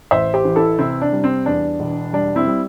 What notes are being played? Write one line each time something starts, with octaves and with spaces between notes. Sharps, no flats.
A1 C5 E5
G4 C5
E3
E4 A4
C3 C4 E4
D4
G3
C4
E2 D4
E1
G3 D4
C4 E4
G3